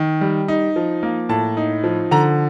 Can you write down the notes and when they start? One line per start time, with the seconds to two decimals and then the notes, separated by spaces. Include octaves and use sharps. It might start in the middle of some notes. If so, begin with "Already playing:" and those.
Already playing: D#3
0.21 G3
0.48 D#4
0.76 F3
1.03 A#3
1.29 A2 A5
1.57 D#4
1.84 F3
2.11 D3 A#5